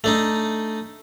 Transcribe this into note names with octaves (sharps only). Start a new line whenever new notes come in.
A3 D4 D#4